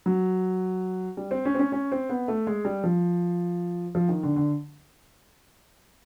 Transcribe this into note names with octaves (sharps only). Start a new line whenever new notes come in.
F#3
G3
C4
C#4
C4
C#4
C#4
C4
B3
A3
G#3
G3
F3
F3
D#3
D3
D3